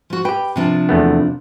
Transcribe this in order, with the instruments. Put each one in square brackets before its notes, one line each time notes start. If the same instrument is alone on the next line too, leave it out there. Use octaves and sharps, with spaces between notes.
[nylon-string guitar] F3 F#4
[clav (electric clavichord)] G4 B4 [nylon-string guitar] G5
[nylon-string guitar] C3 F3 D4
[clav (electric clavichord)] E2 A3 B3